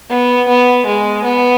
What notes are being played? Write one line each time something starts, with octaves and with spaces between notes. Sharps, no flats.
B3
B3
G#3
B3